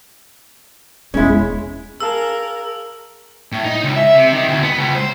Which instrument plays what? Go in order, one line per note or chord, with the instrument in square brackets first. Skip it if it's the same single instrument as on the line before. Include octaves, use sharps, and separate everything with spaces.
[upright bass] E1 B3 [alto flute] G#3 [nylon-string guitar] C#4 E4
[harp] G#4 F5 A5 [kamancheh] A#4 [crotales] E6
[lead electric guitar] A2
D#4
C#2
E5
C3
D#3
D2
B3
C#2
C5